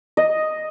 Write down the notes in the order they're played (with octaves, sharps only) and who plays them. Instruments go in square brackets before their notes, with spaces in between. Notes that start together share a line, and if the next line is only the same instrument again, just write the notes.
[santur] D#5